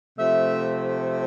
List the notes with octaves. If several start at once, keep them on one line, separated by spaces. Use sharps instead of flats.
C3 F3 A3 E5